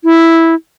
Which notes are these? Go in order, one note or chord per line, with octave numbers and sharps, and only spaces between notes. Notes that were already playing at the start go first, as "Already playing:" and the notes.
E4